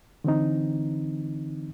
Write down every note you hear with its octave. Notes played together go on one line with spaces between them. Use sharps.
D3 E3 C4 D#4